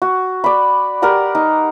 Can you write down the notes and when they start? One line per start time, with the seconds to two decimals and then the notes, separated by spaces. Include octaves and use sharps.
0.02 F#4
0.44 D5 B5
1.02 G4 A#4 D5 F#5
1.35 D#4